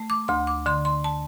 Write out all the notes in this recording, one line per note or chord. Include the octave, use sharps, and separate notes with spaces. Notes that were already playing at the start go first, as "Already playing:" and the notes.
Already playing: A3
D6
D2 C6
D6
D3 C6
C6
A5